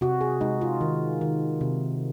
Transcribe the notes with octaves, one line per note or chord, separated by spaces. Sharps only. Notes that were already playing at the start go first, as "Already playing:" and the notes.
C3 F#4
G#4
G#3 D#4
F4
D#3
D#3
C3